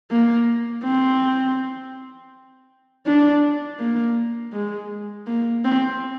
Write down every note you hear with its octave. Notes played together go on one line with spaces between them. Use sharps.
A#3
C4
D4
A#3
G#3
A#3
C4